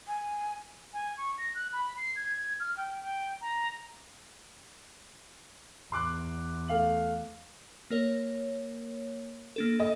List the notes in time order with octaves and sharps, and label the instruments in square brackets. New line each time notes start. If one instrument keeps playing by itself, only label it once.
[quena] G#5
[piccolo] G#5
C#6
A#6
F#6
B5
C7
G#6
F6
G5
G5
A#5
[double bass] E2 [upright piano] C6 D6 F#6
[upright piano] A3 F5 F#7
[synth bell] A#3 A#4 C#5
A#3 D4 A4
[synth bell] A4 [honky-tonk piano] D#5